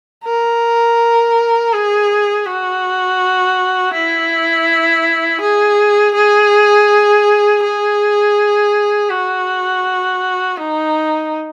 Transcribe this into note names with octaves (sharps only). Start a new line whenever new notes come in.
A#4
G#4
F#4
E4
G#4
G#4
G#4
F#4
D#4